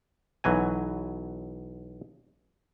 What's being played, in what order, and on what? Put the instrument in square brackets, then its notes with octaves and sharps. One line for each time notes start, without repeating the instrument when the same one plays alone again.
[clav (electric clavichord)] B1 E3 F#3 G#5